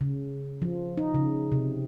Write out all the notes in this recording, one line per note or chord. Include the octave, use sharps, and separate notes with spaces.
C#3
F3
D#4
C#3
C3